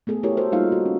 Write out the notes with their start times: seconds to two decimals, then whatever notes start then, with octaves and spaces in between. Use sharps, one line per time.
0.07 A3 B3 G#4 A4
0.23 A3 E4 G4 A4 A#4 C#5
0.37 E4 F#4 A4 C5
0.52 G3 A#3 D#4 F4 F5
0.72 F#4
0.86 C#4